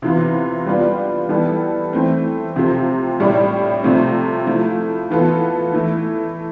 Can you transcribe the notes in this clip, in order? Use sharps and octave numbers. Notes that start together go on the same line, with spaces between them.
C3 E3 B3 F4
G3 B3 D4 F4
E3 G3 B3 E4 A4
E3 A3 C4
C3 F3 C4 G4
A2 G3 D4 G4
C3 F3 A3 C4
F3 A3 E4
E3 B3 F4 A4
E3 A3 E4